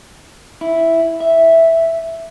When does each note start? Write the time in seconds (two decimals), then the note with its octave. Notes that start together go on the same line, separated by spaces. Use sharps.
0.61 E4
1.20 E5